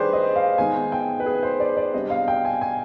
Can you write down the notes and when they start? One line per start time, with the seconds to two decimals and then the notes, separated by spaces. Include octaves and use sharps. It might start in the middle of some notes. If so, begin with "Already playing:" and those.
Already playing: D#3 G3 D4 G4 G#4 B4 C5 D5
0.13 D#5
0.36 F5
0.58 D#3 G#3 B3 D#4 G#5
0.92 G5
1.20 B4
1.26 G#4
1.43 C5
1.60 D5
1.77 D5
1.94 C3 G3 B3 D4 D#5
2.10 F5
2.28 G5
2.45 G#5
2.61 G#5